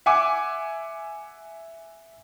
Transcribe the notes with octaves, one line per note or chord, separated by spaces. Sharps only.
E5 F#5 G#5 D6